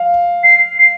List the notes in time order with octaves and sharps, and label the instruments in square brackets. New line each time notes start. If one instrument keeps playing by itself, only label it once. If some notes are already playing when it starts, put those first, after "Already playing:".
Already playing: [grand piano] F5
[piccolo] C7
C7